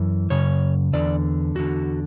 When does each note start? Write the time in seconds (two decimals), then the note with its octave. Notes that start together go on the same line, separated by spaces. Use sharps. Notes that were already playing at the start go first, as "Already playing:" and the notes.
Already playing: F#2 E3
0.30 F#2 C#3 C#5
0.93 E2 D3 D5
1.55 E2 D3 F#4